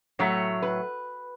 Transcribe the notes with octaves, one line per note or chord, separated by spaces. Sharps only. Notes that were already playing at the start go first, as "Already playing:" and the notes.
A2 F#3 A3 C#5
B4